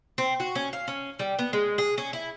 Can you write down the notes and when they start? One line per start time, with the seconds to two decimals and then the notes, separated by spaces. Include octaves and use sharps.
0.18 C4
0.40 F#4
0.55 C#4
0.73 F5
0.88 C#4
1.19 G3
1.39 B3
1.53 G#3
1.78 G#4
1.98 C#4
2.13 E4